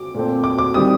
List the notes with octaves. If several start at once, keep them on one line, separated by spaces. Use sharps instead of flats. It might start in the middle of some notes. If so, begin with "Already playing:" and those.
Already playing: D6
A#2 A3 C4
D6
D6
D#3 G3 C4 D#6